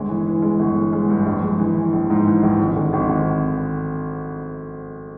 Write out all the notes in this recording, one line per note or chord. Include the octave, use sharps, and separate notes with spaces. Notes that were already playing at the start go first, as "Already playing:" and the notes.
Already playing: G1 G#3
E3
E3
G#3
G1
E3
G#3
G2
A#1
G#3
E3
E3
A#1
G#2
E3
A#1
G#1
D3
G#1
G#1